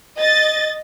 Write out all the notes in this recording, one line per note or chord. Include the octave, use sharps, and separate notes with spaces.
D#5 A6